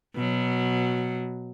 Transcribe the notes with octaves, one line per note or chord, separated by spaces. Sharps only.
B2 F#3